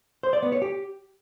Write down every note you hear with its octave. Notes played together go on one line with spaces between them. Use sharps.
C5
D5
B3
C#5
G4